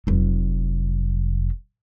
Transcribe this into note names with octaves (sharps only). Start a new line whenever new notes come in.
F1 F#3